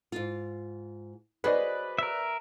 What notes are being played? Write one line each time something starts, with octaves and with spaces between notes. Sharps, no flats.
G#2 F4
F#4 G#4 B4 C5 D5 D#5
A#4 E5